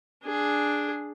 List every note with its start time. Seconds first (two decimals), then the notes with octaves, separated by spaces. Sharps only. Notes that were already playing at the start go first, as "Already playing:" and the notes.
0.24 D4 G#4